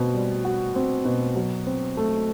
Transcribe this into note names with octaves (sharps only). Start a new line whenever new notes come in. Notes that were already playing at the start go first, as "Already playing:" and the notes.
Already playing: B2 C4
G3
F#4
C4
B2
F#3
C4
A3